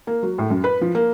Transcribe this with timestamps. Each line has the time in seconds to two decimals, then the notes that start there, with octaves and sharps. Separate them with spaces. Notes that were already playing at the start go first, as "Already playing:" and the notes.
0.07 A#3
0.23 F#3
0.38 A2
0.50 F#2
0.64 B4
0.81 F3
0.95 A#3